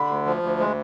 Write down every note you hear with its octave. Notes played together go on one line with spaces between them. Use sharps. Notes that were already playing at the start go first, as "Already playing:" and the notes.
Already playing: D3 B5
D2
F3
D2
G#3